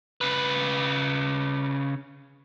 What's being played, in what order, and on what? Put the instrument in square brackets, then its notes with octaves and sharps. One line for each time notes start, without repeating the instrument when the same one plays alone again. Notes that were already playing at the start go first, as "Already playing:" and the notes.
[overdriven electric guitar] C#3 B4